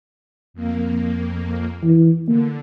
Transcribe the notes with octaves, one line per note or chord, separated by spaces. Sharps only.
F2 A#3
E3
D3 A#3